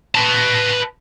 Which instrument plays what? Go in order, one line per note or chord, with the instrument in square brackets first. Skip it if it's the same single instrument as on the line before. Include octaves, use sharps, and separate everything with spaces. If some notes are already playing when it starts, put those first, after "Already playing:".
[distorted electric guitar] B4 A5